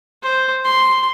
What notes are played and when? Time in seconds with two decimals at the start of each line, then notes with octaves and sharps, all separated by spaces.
0.23 C5
0.65 C6